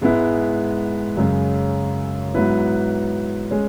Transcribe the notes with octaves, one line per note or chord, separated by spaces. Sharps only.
G#2 G#3 B3 E4
F#2 C#3 G#3
G#2 F#3 B3 E4 B4
G#3 C#4